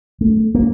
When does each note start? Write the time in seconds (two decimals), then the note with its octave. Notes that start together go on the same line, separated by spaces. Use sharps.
0.21 A3
0.55 A#3